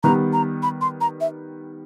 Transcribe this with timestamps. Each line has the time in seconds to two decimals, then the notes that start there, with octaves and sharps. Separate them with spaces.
0.03 D#3 G3 B3 A#5
0.33 A#5
0.63 B5
0.81 C6
1.01 A#5
1.21 E5